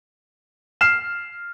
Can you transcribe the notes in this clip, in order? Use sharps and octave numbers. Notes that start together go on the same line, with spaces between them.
F6 C7 E7